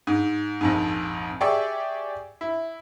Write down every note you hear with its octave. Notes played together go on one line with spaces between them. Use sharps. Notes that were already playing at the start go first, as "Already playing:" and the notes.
G#2
A#1 F2 G#2
G4 G#4 D5 E5 C#6
E4